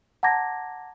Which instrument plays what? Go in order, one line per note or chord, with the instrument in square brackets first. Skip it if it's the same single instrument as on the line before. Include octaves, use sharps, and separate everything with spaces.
[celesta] F#5 A5 A#5 D6 G#6 A#6